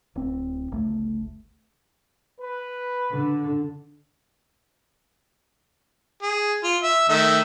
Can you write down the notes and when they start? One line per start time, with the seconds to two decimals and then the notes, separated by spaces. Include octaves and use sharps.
0.15 D1 C4
0.72 G1 C#2 A3
2.41 B4
3.13 D3
6.22 G#4
6.64 F4
6.83 E5
7.09 D#3 A3 E5